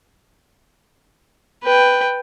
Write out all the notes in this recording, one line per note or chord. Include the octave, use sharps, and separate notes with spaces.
B4 G5